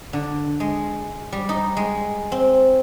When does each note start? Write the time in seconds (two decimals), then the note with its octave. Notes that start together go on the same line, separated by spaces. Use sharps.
0.13 D3
0.60 G#3
1.32 G3
1.49 D#4
1.77 G#3
2.32 C4